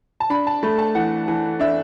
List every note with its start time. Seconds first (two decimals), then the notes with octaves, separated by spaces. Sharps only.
0.20 A5
0.30 D4 B5
0.47 A5
0.63 A3 B5
0.78 A5
0.95 E3 F#5
1.28 E3
1.60 D4 E5